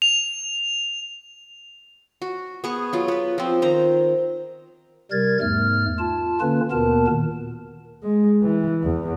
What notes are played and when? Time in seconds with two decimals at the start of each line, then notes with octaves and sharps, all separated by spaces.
0.02 F7
2.22 F#4
2.64 B3 G#4 C#6
2.93 F#3 F4
3.08 B3 B4
3.38 F3 C4
3.62 D#3 C5 A#5
5.11 C3 G3 A#4 G#6 A6
5.41 E2 G#2 A3 F6
5.99 F4 A5
6.41 D3 A#3 C#4 F4 B4
6.71 D#2 B2 B3 A#4 A5
7.08 A#2 D#3
8.03 G#3
8.42 E3
8.84 E2